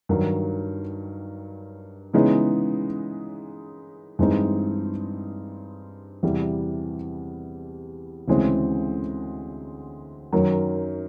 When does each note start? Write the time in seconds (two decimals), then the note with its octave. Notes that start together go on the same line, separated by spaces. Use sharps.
0.09 G2 D#3 F#3
2.14 C#3 E3 G#3 B3 D#4
4.19 G2 E3 G#3 C4 D#4
6.23 E2 C3 E3 G3
8.28 D2 C#3 E3 G#3 C4
10.33 F#2 D#3 F#3